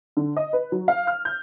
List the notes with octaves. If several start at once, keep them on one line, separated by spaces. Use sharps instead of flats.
D3
D#5
B4
F#3
F5
F6
G6